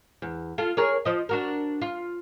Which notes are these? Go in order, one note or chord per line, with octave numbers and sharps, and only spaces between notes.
E2
F4 A4
G#4 A#4 C#5
F3 D#5
D4 F#4 A#4
F4